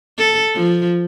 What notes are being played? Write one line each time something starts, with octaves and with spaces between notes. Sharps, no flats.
A4
F3